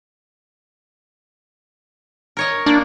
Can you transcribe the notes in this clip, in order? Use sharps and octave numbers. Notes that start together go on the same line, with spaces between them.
A#4 C#5 D#5
A#3 D4